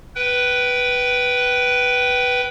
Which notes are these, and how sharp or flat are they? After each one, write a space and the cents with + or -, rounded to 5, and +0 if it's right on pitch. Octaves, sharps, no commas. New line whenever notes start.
B4 +0 G5 -25